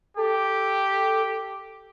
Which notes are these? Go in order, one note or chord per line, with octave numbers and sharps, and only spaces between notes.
G4 A4